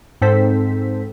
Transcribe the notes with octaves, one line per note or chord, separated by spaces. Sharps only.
G#2 C4 A4 C5 B6